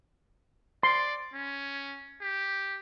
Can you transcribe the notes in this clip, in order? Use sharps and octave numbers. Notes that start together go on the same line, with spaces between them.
D5 C6
C#4
G4